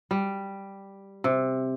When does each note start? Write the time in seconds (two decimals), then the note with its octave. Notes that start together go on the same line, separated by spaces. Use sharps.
0.11 G3
1.24 C3